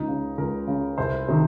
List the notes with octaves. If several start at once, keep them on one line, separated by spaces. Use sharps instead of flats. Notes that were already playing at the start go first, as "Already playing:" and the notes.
Already playing: C#2 D#4
C#3
C#2 A#4
C#3
C2 C5
C3 D#3